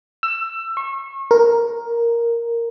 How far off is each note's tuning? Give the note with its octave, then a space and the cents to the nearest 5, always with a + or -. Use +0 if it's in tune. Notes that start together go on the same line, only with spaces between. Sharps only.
E6 +20
C#6 -35
A#4 +0